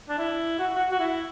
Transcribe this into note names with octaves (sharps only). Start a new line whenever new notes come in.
D4
E4
F#4
F#4
F#4
E4